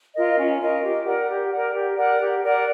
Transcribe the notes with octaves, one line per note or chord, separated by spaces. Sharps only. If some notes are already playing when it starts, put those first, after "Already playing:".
F4 A#4 D#5
C#4
F4 A#4 D#5
G4
A#4 D5 F#5
G4
A#4 D5 F#5
G4
A#4 D5 F#5
G4
A#4 D5 F#5